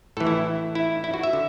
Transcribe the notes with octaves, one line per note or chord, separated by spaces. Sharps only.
A2 E3 A4
E4
E4
E4
F#4
E5
D3